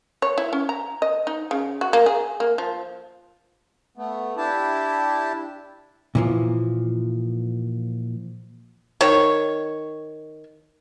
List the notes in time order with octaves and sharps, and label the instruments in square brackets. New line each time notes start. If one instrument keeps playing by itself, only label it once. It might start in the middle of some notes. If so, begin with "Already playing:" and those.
[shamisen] C#5
E4
C#4
A#5
D#5
D#4
C#3
F#4
A#3
G#4
A#3
F3
[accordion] A3 B3
D4 E4 G4 A5
[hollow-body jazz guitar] A#2 E3 F3
[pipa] D#3 C#5